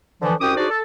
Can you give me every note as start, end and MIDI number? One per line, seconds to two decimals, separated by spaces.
0.22 0.33 50
0.22 0.33 52
0.22 0.33 53
0.40 0.53 36
0.40 0.53 61
0.40 0.53 66
0.40 0.53 79
0.40 0.53 86
0.40 0.53 87
0.57 0.67 62
0.57 0.67 63
0.57 0.67 66
0.57 0.67 68
0.57 0.67 72
0.57 0.67 74
0.69 0.81 69